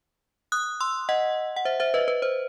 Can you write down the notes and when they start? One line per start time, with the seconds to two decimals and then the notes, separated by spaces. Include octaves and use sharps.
0.52 D#6 F#6
0.80 C6 E6
1.09 D#5 F#5
1.56 F#5
1.65 C5 E5
1.80 C5 E5
1.94 B4 D#5
2.08 B4
2.22 C5